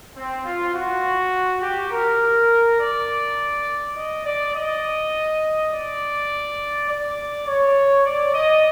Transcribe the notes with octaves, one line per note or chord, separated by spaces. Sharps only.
C4
F4
F#4
G4
A#4
D5
D#5
D5
D#5
D5
D5
C#5
D5
D#5